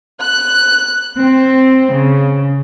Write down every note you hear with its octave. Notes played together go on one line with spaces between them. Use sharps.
F#6
C4
C#3